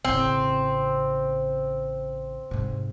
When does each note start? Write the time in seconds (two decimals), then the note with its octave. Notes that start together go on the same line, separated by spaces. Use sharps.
0.05 A1 C#3 C4
2.51 G#2 C3